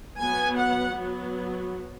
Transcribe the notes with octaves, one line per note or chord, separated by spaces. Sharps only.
F#3 B3 G#5
F#5
F#3 B3